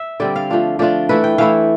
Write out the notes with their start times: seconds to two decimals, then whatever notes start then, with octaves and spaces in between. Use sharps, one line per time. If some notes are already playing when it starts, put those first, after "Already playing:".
Already playing: E5
0.20 D3 G3 C4 D5
0.36 F5
0.50 F3 A3 D4 F4
0.79 F3 A3 D4 F4 D5
1.09 E3 A3 E4 B4
1.24 G5
1.38 E3 A3 E4 F5